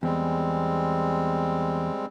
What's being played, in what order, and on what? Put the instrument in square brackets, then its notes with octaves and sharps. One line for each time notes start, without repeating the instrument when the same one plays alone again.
[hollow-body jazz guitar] E2 [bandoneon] G3 G#3 C4